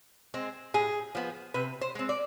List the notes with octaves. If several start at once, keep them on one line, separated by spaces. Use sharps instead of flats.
G#3 C4
A2 G#4
F3 B3
C3 B4
C5
G#3 C4
D5